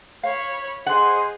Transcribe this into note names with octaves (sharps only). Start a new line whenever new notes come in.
C#5 F5 B5
G#4 C5 D#5 F#5